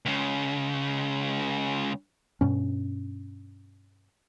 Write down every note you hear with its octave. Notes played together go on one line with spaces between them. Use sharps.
C#2 C#3
G2 B2 C#4